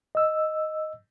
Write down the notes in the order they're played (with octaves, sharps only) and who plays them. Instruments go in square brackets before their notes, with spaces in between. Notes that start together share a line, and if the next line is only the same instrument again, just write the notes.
[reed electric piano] D#5 E6